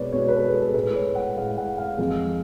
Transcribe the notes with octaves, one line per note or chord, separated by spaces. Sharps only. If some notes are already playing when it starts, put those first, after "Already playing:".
Already playing: B2 G#3 B4 C#5 D5
B2 G#3 C#5
B4
A4
G#4
A4
A2 G#3 B4
C#5
F#5
A2 G#3 F5
F#5
F5
F2 F3 G#3